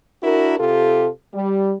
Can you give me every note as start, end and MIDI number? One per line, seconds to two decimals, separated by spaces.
0.23 0.58 62
0.23 0.58 64
0.23 0.58 66
0.23 0.58 70
0.59 1.07 48
0.59 1.07 65
0.59 1.07 67
0.59 1.07 69
1.34 1.74 55